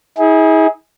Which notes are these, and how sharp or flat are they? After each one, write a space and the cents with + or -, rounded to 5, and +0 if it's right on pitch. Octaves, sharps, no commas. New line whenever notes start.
E4 -45 G#4 +0